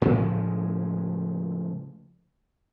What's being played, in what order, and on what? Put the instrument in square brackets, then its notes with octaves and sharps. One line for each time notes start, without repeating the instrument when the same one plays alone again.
[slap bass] A2 C#3 F3 G#3